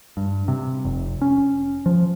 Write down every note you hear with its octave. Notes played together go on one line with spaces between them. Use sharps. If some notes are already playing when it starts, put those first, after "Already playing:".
G2
C3
F1
C#4
F3